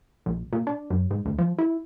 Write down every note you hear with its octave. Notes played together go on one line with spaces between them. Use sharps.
A#1
A#2
D4
F#2
G#2
D2
F3
E4